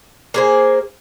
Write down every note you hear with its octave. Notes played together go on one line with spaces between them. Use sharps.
A#3 G#4 C5